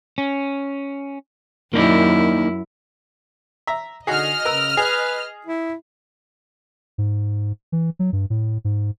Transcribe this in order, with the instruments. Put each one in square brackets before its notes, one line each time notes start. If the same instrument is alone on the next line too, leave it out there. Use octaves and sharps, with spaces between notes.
[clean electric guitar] C#4
[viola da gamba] F#2 E4 [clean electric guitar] A#3 D#4 D5
[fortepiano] E5 A#5
[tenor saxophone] D3 [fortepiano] D#4 F#4 G#4 [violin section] D#5 F6
[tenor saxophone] C#3 [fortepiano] A#4 B4 E6
[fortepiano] G#4 [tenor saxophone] B4
[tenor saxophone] E4
[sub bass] G#2
E3
F#3
G2
A2
G#2